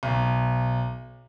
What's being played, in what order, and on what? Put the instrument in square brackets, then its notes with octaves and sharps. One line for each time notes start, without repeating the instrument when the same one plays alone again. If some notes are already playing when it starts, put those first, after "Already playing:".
[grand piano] B1